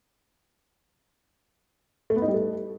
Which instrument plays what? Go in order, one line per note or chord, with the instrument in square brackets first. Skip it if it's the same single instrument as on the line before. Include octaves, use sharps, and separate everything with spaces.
[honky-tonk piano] A3
B3
D#4
G3
A3